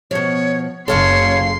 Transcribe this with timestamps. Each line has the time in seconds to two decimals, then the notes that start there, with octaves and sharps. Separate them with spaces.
0.11 B2 F3 C#5
0.88 F#1 C#3 A4 C#5 F5 G#5 C6 C7